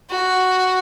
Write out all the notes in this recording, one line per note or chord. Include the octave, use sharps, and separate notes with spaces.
F#4